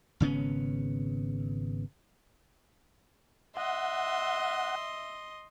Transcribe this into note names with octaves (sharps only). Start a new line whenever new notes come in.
G#1 C#3 B3 C#4
D#5 E5 F#5 C6